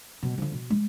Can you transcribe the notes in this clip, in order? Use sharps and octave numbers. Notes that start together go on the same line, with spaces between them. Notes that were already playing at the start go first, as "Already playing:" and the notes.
B2 F#3
D3 F3
B2
G#3